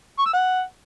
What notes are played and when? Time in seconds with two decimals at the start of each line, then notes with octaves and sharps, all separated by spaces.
0.19 C#6
0.26 E6
0.33 F#5